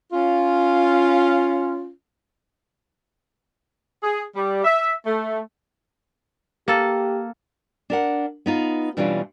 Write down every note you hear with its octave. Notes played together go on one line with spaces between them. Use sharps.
C#4 F4
G#4
G3
E5
A3
A#3 G4 A4
D4 A#4 F#5
B3 D#4 F4
B2 E3 G3 C#4 D4 F4